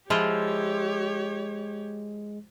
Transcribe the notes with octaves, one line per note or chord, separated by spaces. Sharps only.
F3 G#3 E4 F4 G4 C#5